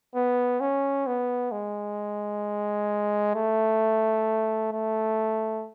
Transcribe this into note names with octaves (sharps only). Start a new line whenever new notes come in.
B3
C#4
B3
G#3
A3
A3